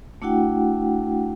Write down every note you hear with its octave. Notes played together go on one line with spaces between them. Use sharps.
A3 D4 E4 F#4 F#5 G5